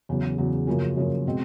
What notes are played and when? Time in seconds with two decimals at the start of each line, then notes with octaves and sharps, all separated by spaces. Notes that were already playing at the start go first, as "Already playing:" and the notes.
0.09 E2 C#3 F#3
0.38 E2 C#3 F#3
0.67 F#2 C#3 F3 A#3 C#4
0.96 F#2 C#3 F3 A#3 C#4
1.27 B2 G#3 C4